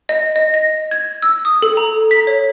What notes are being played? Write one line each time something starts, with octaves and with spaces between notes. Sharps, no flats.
D#5
D#5
A#6
G#6
E6
D#6
A4
A#5
B6
C#5